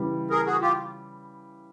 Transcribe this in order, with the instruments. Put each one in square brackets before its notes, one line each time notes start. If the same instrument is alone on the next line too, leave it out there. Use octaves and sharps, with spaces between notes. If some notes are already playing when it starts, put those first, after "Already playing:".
Already playing: [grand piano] C#3 E3 G3
[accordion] G#4 A#4
F#4 G#4
F4 G4